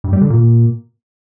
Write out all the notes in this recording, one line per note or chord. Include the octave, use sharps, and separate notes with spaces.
G2
G3
D3
A#2